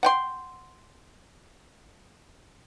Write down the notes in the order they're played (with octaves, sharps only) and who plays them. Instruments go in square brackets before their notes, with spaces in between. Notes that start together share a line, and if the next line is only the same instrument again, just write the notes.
[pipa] F#5 G5 C6